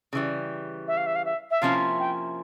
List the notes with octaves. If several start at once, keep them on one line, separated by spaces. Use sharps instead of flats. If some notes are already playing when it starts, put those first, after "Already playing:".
C#3 E3 G3
E5
F5
E5
F5
E5
E5
C3 F3 A#3 C#4 E4 F5
G5